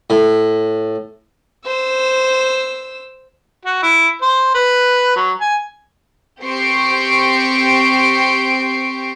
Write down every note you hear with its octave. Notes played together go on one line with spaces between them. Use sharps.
A2
C5 E6
F#4
E4
C5
B4
F#3
G#5
C4 G4 C5 C#6 C7 D7